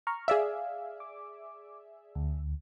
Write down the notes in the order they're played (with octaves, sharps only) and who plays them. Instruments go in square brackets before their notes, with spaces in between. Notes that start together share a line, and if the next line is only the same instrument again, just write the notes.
[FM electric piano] A#5 C#6 F6
[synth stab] G#4 D5 E5 [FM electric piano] F5
[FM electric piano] D6
D2